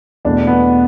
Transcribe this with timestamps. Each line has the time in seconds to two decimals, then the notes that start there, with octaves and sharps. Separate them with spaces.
0.25 E2 B2 A3 D4
0.47 B3